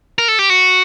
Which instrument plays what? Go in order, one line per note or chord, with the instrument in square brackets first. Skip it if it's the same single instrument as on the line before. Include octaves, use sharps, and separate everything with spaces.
[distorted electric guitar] A#4
A4
G4
F#4